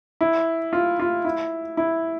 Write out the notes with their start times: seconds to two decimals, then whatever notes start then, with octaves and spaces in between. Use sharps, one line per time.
0.21 E4
0.73 F4
1.00 F4
1.25 E4
1.77 E4